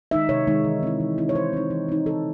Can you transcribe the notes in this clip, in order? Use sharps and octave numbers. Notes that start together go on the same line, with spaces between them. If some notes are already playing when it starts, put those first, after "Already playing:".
D#3 G#3 D#4 E5
C3 C#5
D#3 G#3 D#4
E3
C4 E4
E3
C4 E4
C#5
E3 C5
C4 D#4
E3
C4 D#4
C#3 A4